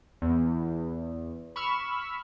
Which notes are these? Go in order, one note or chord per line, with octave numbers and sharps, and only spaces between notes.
E2
B5 C#6 E6 F6